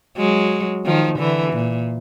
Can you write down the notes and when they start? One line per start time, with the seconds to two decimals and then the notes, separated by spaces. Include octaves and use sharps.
0.17 F#3 G#3
0.86 D#3 F3
1.19 D3 E3
1.53 A#2